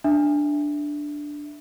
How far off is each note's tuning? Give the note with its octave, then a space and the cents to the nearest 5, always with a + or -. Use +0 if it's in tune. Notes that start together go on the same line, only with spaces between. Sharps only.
D4 +0 E5 +0